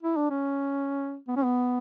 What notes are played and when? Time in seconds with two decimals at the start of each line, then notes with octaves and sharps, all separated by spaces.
0.03 E4
0.17 D4
0.30 C#4
1.28 B3
1.36 C#4
1.44 B3